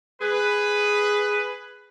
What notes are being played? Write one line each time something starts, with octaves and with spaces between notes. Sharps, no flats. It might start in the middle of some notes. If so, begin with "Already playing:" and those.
G#4 B4